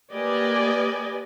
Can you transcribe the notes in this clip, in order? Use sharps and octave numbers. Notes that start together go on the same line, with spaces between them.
A#3 G4 B4 D5 D#5 G#5